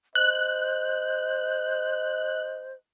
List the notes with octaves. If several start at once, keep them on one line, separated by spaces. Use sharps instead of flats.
C5 D#5 F#6